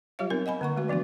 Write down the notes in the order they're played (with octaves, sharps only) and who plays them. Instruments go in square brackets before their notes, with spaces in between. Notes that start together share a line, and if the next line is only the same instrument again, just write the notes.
[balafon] F#3 G3 F4 G4 C#5 F5
B3 C4 D#4 A#4
D#5 F#5 G#5 B5
D3 A#3 F#5 C#6
G#3 A3 F#4 B4
E3 F3 B3 D4 F#4